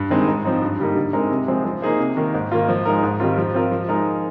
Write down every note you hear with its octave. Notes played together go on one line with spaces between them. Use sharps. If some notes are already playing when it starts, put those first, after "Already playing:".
Already playing: G2
D#3 G#3 C4 D#4
G#2
F3 C4 D#4
G2
D3 G3 A#3 D#4
D3
G#3 C4 D#4 A#4
C3
F3 G#3 C4
F3
A#3 D#4 G#4 C5
C3
D#3 A#3
G#2
D#3 A#3 F4
F3
G#3 D#4 A#4
G#2
D#3 G3 C4 F4
F3
C4 F4 A#4
F3
G#3 D#4 A#4